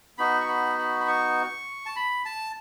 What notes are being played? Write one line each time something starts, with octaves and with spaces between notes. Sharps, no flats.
B3 D#4 F#4 B5
C#6
B5
B5
B5
C#6
A5
B5
A5